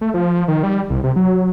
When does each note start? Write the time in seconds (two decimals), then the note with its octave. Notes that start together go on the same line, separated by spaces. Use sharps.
0.01 A3
0.14 F3
0.48 D#3
0.63 G3
0.90 C2
1.04 C3
1.16 F#3